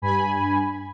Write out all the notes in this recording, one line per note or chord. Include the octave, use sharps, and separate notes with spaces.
G2 G#5 B5